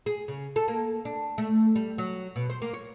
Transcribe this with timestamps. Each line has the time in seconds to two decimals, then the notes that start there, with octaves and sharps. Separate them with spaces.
0.06 G#4
0.28 C#3
0.56 A4
0.68 A#3
1.05 D4
1.38 A3
1.76 G3
1.98 F#3
2.36 B2
2.50 C5
2.62 A#3
2.74 C#5